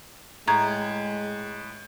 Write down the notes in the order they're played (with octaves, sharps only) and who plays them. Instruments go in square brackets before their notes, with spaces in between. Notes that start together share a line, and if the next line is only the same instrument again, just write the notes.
[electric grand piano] A2 [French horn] G#3 [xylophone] A#5 G#6